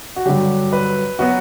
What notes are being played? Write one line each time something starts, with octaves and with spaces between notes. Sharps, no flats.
F#4
G2 D3 F#3 G4
B4
F#3 B3 F#4